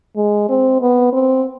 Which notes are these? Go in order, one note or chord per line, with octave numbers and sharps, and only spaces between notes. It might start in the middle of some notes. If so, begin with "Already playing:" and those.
G#3
C4
B3
C4